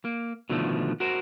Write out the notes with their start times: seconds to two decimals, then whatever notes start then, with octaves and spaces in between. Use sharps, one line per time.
0.05 A#3
0.50 B2 D3 D#3 F3 A3
1.00 F#4 A#4 C5